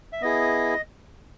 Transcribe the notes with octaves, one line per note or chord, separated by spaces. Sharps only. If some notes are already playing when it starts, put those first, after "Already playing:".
E5
B3 E4 G#4 D#5